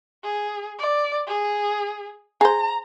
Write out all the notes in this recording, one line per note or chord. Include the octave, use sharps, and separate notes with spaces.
G#4
D5
G#4
G#4 C5 A#5